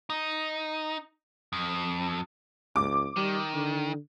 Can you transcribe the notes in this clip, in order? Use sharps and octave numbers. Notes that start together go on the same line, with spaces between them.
D#4
F2
C#2 D6
D#3 G3
D3